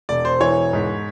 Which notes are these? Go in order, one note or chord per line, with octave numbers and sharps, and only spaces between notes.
E1 D5
C5
E3 C#5
G#2